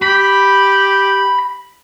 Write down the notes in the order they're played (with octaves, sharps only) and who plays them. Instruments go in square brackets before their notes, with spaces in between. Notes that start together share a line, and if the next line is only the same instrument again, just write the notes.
[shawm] G4 [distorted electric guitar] B5